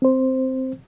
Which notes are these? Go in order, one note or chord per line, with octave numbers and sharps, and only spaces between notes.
C4 C5